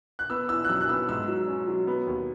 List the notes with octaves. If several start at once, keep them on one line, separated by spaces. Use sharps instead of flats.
F#6
B3 E6
E4 E6
F#6
F#2 E6
F#6
B3 E6
G#2 E6
F#3
C#4
F#3
B3
D#2